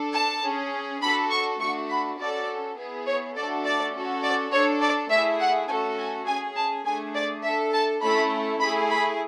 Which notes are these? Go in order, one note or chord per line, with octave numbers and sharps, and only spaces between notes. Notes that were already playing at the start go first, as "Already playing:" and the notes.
Already playing: D4 A4
A5
C#4 G#4
D4 F#4 A4 B5
C#6
A3 D4 F#4 C#6
B5
C#4 F#4 A4 D5
B3 E4 G#4
C#5
A3 D4 F#4 A4 D5
D5
C#4 F#4 A4
D5
D4 A4 C#5
D5
A3 E4 G#4 E5
F#5
A3 C#4 F#4 A4 G#5
G#5
C#4 G#4 G#5
A5
A3 D4 G#4 G#5
D5
D4 A4 E5
A5
A3 C#4 E4 A4 B5
A3 E4 G#4 B5
B5